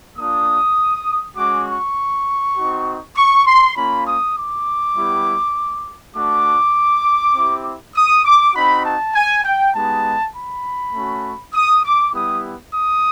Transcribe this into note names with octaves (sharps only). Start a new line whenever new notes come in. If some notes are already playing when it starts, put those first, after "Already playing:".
A#3 D4 F4 D#6
G#3 C#4 F#4 D6
C#6
C4 D#4 F#4
C#6
C6
A#3 C#4 F4 B5
D#6
D6
G3 B3 E4 G4
A3 D4 F#4 D6
C4 E4 G4
D#6
D6
C4 D#4 F#4 B5
A5
G#5
G5
G#3 B3 D#4 G4 A5
B5
A3 C#4 F#4
D#6
D6
G3 B3 E4 G4 D#6
D#6